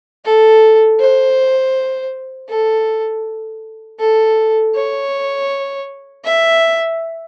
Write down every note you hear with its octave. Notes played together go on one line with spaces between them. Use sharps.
A4
C5
A4
A4
C#5
E5